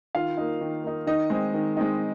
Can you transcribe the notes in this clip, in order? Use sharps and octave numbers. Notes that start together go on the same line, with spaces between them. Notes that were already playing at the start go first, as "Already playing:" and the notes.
D#3 F4 F5
A#3 D#4
D#3
A#3 D#4
D#3 D#4 D#5
G#3 C4 D#4
D#3
G#3 C4 D#4